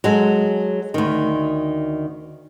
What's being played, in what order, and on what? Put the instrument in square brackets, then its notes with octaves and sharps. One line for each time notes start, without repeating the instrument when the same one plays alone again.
[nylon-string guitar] F#3 G#3 A4
D2 D#3